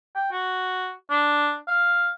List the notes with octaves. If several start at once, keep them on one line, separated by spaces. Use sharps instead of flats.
G5
F#4
D4
F5